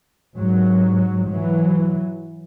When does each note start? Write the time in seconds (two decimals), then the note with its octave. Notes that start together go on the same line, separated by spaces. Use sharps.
0.36 G#2 F#3
1.28 E3 F#3